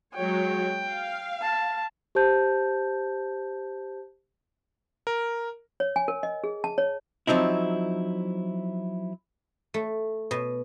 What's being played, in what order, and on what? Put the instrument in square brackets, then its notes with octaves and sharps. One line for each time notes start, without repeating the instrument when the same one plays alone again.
[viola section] F#3 G#3 C#5 [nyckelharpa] G5
[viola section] F5
[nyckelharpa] A5
[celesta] G4 C5 A5 G6
[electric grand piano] A#4
[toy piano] C#5
G#5
A#4
D#5
G#4
A5
C#5
[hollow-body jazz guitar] F3 F#3 C4 D#4 E4
[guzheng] A3
B2